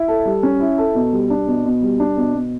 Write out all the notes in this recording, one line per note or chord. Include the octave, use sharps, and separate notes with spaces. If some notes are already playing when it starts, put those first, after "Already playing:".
Already playing: E4
A4
G3
C#4
E4
A4
B2
G3
D4
B2
B2
G3
D4
B2
B2